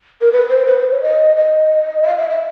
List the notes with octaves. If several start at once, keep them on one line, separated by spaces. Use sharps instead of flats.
A#4
B4
C5
B4
C5
C#5
D#5
D#5
E5
F5
E5
E5